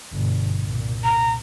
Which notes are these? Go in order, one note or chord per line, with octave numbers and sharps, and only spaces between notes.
G1 B2
C2 A#2
A#5